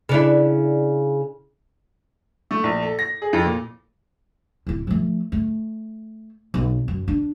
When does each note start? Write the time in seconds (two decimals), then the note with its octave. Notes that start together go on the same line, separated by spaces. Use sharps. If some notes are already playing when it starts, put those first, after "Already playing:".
0.09 C#3 D4 E4
2.51 A3
2.64 A#1
2.82 A4
2.99 A#6
3.22 G#4
3.33 F2
3.46 A#2
4.67 D1 E4
4.87 F3 A3
5.32 A3
6.54 B1
6.88 F#2
7.08 D4